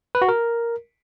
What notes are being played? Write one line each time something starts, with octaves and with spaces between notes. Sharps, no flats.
B4
F#4
A#4